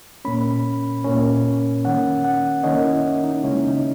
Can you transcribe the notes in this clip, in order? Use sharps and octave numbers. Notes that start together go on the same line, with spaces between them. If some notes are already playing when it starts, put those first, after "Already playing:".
A#2 A#3 C#4 B5
A#2 A#3 C#4
D#3 A#3 C#4 F#5
F#5
D#3 A#3 C#4 D#5
E4
D#4
C#3 G#3 C#4 E4
D#4